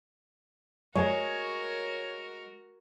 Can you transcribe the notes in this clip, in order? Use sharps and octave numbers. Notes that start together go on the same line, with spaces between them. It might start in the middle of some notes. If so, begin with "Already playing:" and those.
G#3 F#4 A#4 C#5